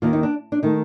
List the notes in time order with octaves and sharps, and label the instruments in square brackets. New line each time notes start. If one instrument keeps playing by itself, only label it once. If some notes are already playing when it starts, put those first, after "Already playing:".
[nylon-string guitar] D#2 D#3 A#3 F4
D#4
D4
D4
D#3 A3 D#4